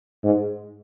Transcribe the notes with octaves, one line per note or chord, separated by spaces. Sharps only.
G#2